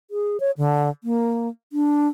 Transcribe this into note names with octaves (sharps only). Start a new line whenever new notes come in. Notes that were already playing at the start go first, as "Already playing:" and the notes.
G#4
C#5
D3
A#3
D4